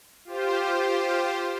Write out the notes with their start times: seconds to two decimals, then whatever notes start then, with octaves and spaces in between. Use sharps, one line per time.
0.25 F4 G4 C5